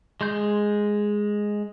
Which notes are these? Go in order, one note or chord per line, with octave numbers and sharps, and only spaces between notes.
G#3 C6 G6